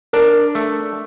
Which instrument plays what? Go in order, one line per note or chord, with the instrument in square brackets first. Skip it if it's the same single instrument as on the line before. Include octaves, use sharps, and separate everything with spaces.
[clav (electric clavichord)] D4 [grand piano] A#4
[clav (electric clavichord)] A3